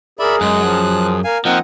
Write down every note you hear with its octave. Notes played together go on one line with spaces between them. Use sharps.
G#4 A#4 D5 E5 B5
F#2 G#3 F#6
F3
A#4 F5 G#5
F3 A#3 C4 D#4 D#5 F#5